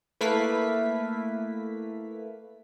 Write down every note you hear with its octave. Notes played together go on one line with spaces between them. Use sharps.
A3 A#3 E4 B4 F5 B6